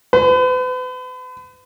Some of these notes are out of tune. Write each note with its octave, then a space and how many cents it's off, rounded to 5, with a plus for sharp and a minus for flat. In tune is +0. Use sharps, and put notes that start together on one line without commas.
B4 +40